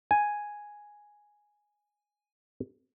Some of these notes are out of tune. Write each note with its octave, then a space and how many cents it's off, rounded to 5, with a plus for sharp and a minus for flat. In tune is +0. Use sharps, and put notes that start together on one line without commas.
G#5 +0